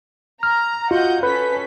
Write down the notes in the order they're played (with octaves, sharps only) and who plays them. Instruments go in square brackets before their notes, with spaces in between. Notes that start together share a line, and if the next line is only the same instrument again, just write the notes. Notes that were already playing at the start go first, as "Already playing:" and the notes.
[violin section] A#5 [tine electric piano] F6
[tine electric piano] F4 F#4 [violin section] D#5 F#5 G6
[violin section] C#4 A4 B6 [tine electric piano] B4